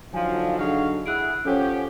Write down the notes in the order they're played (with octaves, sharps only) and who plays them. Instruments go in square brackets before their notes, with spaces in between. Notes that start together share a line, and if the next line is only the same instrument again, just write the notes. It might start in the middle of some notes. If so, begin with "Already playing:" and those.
[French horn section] D3 F#3 D#4 [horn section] F3 [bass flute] F5 [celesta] G#5
[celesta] D4 A4 [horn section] G#4 C#5 F5 [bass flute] F#5
[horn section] E4 G#4 [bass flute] F#5 [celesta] F#6 D7
[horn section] F3 G4 [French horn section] C#4 [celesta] A4 [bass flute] F#5